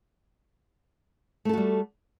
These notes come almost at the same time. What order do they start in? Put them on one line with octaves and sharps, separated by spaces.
A3 A4 F#4 G3